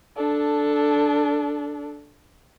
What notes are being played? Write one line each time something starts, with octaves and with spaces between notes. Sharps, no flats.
D4 A4